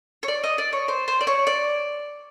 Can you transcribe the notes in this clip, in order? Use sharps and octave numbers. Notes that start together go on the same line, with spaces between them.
C#5
D5
D#5
D5
C#5
C5
C5
D5
C#5
D5